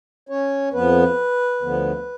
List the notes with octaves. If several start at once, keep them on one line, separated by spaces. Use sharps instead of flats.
C#4 C#5
F2 F3 B3 B4
D2 D3 F3 B3